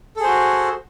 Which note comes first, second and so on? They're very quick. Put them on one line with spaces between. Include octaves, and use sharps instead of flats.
A4 G#4 C5 F#4